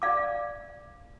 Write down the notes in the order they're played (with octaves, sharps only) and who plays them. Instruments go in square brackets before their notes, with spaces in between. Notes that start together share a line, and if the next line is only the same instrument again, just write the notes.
[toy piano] D5 F5 D6